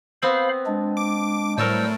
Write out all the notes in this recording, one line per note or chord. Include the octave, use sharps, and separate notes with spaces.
B3 C4 C5 F5 B5
G#3 D4
D6
A2 F#3 G3 A4 A#4 C5 E6